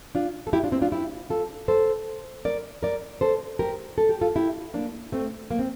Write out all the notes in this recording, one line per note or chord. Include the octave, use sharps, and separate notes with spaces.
D4 F4
A4
E4 G4
D4 F4
C4 E4
D4 F4
E4 G4
F4 A4
A4 C5
A#4 D5
A#4 D5
A4 C5
G4 A#4
A4
G4
F4 A4
E4 G4
A#3 D4
A3 C4
A#3
C4